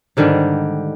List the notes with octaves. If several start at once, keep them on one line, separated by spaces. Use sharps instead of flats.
G#2 D3 D#3 G3